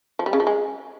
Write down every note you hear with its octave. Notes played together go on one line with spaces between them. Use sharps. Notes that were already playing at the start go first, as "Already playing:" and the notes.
F3
G3
C#3
F3
G#3